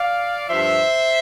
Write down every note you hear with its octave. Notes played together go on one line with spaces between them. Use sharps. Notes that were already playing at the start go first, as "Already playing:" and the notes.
Already playing: D5 F5
G2 F3 C5 E5